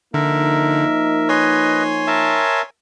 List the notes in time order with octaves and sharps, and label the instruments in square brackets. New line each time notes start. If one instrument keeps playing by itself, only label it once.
[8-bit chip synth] D3 [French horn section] F3 A#3 D#4 [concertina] A#4 E5
[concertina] B4 D#5 [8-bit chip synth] C#5 G#5 C6
[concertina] A#4 E5 A5